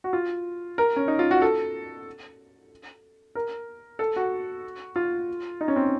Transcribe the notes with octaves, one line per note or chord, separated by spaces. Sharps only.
F#4
F4
A#4
C#4
D#4
F4
F#4
A4
A#4
A4
F#4
F4
D#4
C#4
C4